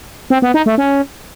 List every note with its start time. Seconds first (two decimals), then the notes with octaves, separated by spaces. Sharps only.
0.30 C4
0.42 B3
0.54 D#4
0.66 A3
0.78 C#4